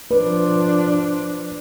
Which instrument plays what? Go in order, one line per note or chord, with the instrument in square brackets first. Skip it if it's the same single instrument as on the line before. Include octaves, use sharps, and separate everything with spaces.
[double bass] F3 D4 [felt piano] B4